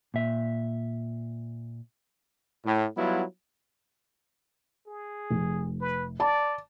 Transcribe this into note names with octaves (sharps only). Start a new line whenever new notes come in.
A#2 E5
A2
F#3 G3 B3 E4 F4
G#4
F1
B4
D5 A5